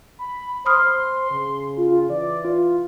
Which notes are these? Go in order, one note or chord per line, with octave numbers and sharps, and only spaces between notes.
B5
C5 B5 C6 D#6 F6
C#3
F4
E3 D5
F4